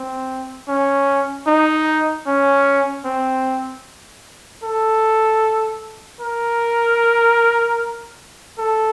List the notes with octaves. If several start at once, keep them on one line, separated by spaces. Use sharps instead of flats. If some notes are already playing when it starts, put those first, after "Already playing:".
Already playing: C4
C#4
D#4
C#4
C4
A4
A#4
A4